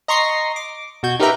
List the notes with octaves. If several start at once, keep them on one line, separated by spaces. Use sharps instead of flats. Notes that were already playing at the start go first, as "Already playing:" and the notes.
D#5 A#5 C6 C#6 A#6 C7
D6
B2 F#4 G6 G#6
D#4 G4 A#4 B4 E5 A#5